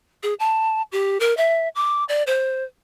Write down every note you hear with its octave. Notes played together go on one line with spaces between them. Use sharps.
G#4
A5
G4
A#4
E5
D6
D5
C5